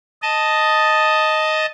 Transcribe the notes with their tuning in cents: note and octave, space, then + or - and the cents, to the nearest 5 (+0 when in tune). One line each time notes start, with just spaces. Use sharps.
D#5 +0 A5 +0